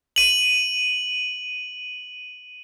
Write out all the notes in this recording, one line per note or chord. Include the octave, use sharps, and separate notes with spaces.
D#7 F#7